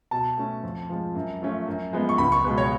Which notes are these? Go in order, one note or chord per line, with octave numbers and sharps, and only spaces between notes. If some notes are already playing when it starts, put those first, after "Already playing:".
B2 A5
A3 C#4
F2
F3 G#3
F#2
F3 A3 C#4
F#2
F3 G#3 B3
C#6
C#2 B5
C#6
B2 G#3 B3
C#5